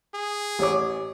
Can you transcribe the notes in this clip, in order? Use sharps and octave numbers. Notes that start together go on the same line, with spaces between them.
G#4
A1 C#5 D6